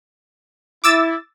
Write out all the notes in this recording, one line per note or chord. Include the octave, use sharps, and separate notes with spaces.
E4 D6 E6 A6